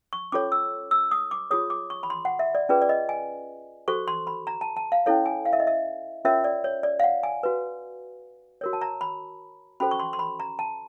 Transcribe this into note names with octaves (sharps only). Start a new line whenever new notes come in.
C#6
C#4 F4 A4 C#5 D6
E6
E6
D#6
D6
F4 G#4 C#5 D#6
D6
C#6
B5
C6
F#5
E5
D5
C#4 F4 G#4 B4 D5
D5
D#5
G#5
F#4 A4 C5 C#6
C6
B5
A#5
A5
A5
F5
C#4 E4 A4 C#5 F5
G#5
F5
E5
D#5
E5
C#4 F4 A#4 C#5 E5
D5
C#5
D5
F5
F#5
G#5
F#4 B4
F#4 A#4 C#5
A5
A#5
B5
C#4 F#4 A4 C5 B5
C#6
C6
C6
B5
A#5
A5